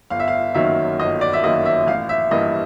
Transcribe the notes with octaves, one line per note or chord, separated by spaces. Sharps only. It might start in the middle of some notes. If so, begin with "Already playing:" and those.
G1 F5
E5
F5
F#2 D#3 F#3 A#3 E5
G1 D#5
D5
E5
F#2 D#3 F#3 A#3 D#5
E5
A1 F5
E5
G2 E3 G3 A#3 D#5